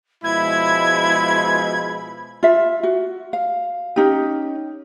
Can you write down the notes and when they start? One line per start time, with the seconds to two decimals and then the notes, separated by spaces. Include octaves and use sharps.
0.24 B2 F3 G#3 E4 B5 G#6
2.43 F4 E5
2.83 F#4
3.33 F5
3.96 C#4 D#4 G4